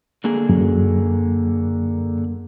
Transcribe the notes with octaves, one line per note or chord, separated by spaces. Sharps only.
D3 A#3 G#4
F#2